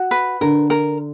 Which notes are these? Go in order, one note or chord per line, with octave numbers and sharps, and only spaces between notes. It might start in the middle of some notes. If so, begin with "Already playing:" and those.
Already playing: F#4
B4
D3 A#4
A#4